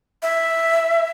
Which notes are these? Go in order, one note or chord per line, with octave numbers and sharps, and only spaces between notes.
E5